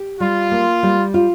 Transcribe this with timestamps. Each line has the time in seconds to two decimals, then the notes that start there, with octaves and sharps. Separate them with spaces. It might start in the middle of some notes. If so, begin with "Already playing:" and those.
Already playing: G4
0.20 G3 F4
0.51 A#3
0.83 G3
1.14 F4